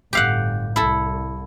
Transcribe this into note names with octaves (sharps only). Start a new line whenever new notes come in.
G1 A2 G4 F5 F#5
C2 E4 A4